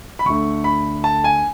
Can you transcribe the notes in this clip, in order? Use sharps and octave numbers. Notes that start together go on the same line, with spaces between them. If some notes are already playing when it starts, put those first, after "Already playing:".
B5
D2 D3 A3 C#6
B5
A5
G#5